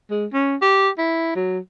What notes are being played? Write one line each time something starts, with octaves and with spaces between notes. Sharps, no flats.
G#3
C#4
G4
E4
F#3